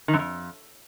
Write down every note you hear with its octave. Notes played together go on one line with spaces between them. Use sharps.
D#3
F#2
F2